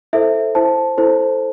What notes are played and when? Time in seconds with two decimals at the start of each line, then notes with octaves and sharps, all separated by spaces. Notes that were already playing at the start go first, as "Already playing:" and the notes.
0.13 E4 A4 C5 E5
0.55 E4 C5 A5
0.98 E4 A4 C5